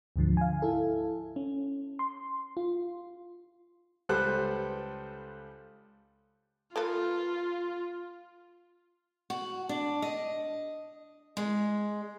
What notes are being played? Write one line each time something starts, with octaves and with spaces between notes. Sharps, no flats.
D2 G#2 D3 F3
F5 G#5
E4 A4
C#4
C6
F4
C#2 G3 A4 B4 C5 F#6
A#3 F4 A4 B4
F#4
D4
D#5
G#3